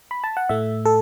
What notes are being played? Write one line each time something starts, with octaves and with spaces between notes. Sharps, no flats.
B5
A5
F#5
A2 A3 E5
A4